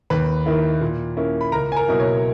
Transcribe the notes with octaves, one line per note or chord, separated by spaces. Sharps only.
D#2 B4 B5
D#3 A#3 E4
A#2
A#3 C#4 E4
B5
C#2 A#4 A#5
G#5
A#4 A#5
B2 F#3 A#3 E4
C#5